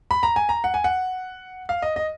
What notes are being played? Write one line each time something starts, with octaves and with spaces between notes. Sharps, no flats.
B5
A#5
G#5
A#5
F#5
G#5
F#5
F5
D#5
D#5